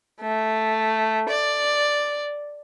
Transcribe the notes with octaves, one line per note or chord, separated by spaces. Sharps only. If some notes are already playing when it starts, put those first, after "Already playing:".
A3
D5